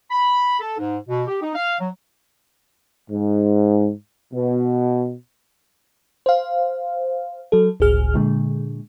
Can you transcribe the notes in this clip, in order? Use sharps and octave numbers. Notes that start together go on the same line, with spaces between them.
B5
A4
G#2
B2
G4
D#4
F5
F#3
G#2
B2
C5 F5
F#3 A4
G1 C#2 A2 G#4 F6
A#2 D3 G#3